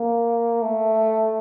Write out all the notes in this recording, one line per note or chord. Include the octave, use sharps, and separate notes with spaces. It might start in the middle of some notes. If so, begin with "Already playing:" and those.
Already playing: A#3
A3